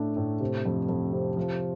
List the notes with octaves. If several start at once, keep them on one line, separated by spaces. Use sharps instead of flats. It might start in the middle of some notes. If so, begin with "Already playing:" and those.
Already playing: A2 A3 D4
A2
C3
F2
F2
C3
F3